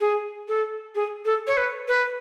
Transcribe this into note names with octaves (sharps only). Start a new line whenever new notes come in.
G#4
A4
G#4
A4
C#5
B4
B4